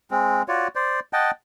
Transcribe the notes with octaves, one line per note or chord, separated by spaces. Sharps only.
G#3 C4
F4 F#4 C#5 D5
C5 D5
D#5 F#5 G5 A5